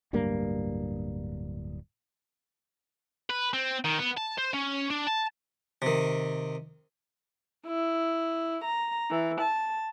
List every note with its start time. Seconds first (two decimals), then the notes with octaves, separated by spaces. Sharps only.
0.13 D1 G2 G3 A#3
3.30 B4
3.54 C4
3.85 D#3
3.98 B3
4.17 A5
4.38 C5
4.54 C#4
4.90 D4
5.07 A5
5.82 C3 D#3
7.67 E4
8.65 A#5
9.10 E3
9.41 A5